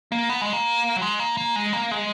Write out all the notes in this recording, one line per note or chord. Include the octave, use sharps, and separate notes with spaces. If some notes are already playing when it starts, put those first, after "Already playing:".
A#3
B3
G#3
A#3
F#3
G#3
A#3
A#3
G#3
A#3
G#3